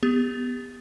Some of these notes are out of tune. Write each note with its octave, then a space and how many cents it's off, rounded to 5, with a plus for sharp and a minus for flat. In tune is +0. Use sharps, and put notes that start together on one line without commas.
B3 +0 G4 +30